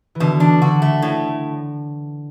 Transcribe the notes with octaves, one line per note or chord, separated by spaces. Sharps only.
E3
B2 D3
D4
D3 F#4
A3
A2